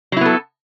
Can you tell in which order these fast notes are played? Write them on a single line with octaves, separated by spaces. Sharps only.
F#3 E4 B3 A4